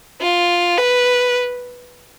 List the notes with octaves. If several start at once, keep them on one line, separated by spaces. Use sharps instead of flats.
F4
B4